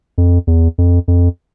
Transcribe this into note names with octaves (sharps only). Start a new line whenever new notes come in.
F2
E2
F2
F2